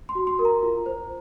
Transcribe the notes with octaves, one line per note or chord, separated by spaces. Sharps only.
C6
F#4
C6
A#4
A#5
F4
C5